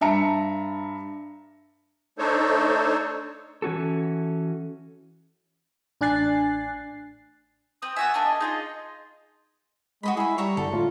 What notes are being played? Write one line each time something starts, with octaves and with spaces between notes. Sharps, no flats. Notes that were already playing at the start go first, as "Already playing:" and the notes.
G2 E5 A5 A#5 C#7
A3 D4 D#4 A4 C5 C#5
E3 C#4 F#4 A4
A1 D4 G#5 F#6 A6 C7
C4 D#6
B3 F#4 E5 G#5
A#3 D4 G#4
D#5
D#4 F4 G#4 D#5
G#3 F#4 D#5 B5
E4 G#4 B5
G3 C#5 E5 A#5
G1 D3 A4
A2 F4